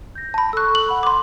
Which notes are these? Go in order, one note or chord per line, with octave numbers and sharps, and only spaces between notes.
G6 A#6
A5 B5
A4 C#6 E6 F#6
F#7
F#5 B5
C6 D6